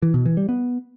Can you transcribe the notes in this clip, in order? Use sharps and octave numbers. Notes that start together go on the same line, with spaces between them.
E3
B2
E3
G3
B3